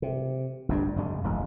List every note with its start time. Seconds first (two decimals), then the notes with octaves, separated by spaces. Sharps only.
0.02 C3
0.69 G1 G2 D4
0.96 F#1 F#2 G#3
1.24 E1 A1 G#3